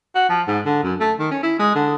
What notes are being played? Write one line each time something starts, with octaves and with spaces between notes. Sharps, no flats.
F#4
F3
G#2
D3
F#2
A3
D#3
C#4
E4
G#3
D3